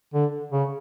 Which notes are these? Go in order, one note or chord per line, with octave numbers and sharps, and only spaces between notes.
D3
C#3